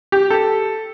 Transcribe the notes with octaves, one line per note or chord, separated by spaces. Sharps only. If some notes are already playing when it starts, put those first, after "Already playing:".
G4
A4